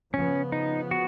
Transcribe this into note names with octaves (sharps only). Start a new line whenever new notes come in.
C#3 F3 B3 C#4
D#4
F#4